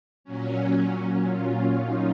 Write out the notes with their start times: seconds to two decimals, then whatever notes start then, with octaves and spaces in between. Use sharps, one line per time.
0.24 A#2 F#3 C#4
1.26 F4
1.78 D#4